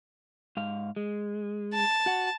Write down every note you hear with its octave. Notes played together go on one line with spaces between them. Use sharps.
G#2 F5
G#3
A5
F#4 F#5